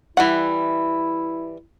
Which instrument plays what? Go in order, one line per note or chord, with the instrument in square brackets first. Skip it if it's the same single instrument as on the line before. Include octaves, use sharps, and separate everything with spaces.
[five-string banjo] E3 G3 F#5 [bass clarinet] E4